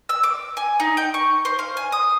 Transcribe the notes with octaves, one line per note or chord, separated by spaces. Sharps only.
E6
D6
G#5
D#4
G5
C#6
C5
F5
G#5
D#6